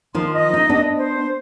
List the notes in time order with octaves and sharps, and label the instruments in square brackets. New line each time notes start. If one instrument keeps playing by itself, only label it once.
[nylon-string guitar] D#3 F3 [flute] C6
[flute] D#5
[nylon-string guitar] D#4
B3 D4
[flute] C5